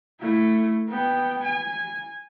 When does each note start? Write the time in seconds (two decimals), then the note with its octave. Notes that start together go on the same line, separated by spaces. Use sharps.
0.20 A3 E4
0.88 B3 G5
1.45 G#5